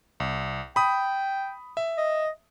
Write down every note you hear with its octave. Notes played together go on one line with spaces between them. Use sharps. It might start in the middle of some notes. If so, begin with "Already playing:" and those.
C2
G5 B5 D#6
E5
D#5